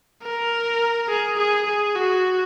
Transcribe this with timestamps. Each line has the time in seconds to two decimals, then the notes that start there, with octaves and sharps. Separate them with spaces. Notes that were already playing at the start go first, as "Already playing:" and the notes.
0.23 A#4
1.09 G#4
1.38 G#4
1.66 G#4
1.95 F#4